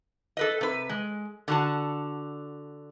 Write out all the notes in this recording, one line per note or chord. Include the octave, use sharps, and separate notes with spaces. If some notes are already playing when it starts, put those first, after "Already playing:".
A4 B4 D#5
C3 B4
G#3
D3 F#4 A5